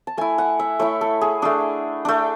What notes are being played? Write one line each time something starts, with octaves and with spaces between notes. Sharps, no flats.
A5
A3 E4 G#5
F#5
E5
A3 E4 C#5
A4
G#4
A3 D4 G#4
A3 D4